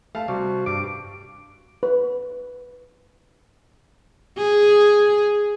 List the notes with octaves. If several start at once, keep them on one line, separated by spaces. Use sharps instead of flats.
A3 F5 A5
C3 G3 F#4
G2 G3 D6
B4
G#4